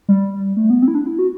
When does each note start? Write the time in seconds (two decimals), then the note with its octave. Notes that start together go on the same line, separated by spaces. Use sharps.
0.09 G3
0.57 A3
0.70 B3
0.82 C4
0.88 E4
0.95 D4
1.06 E4
1.19 F#4